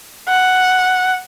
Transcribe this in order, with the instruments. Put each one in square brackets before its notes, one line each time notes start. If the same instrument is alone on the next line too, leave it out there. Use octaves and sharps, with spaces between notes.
[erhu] F#5